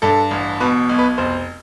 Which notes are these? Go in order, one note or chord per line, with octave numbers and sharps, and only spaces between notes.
G2 A4
A1
B2 B4
B1
B4
F1 C5